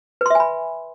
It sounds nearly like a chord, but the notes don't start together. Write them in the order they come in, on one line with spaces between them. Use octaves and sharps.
B4 C6 E5 G#5 B5